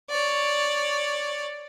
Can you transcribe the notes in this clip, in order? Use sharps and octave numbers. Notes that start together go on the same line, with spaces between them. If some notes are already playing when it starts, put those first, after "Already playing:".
C#5 D5